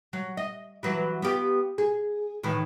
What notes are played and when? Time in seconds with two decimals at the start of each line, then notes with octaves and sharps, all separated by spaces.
0.13 F#3
0.37 D#5
0.83 E3 F#3 B4
1.22 B3 F4 G4
1.78 G#4
2.43 A2 D#3 E3